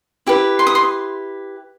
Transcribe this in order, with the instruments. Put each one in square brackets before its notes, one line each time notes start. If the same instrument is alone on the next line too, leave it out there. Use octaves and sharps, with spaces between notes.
[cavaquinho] E4 G4 B4
C6
D#6
C6